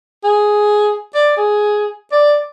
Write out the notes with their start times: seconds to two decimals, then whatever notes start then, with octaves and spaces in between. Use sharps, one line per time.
0.24 G#4
1.14 D5
1.37 G#4
2.12 D5